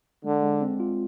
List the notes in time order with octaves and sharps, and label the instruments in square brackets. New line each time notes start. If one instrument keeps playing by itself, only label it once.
[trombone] D3 [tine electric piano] G#3
[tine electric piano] G#3
C4
F4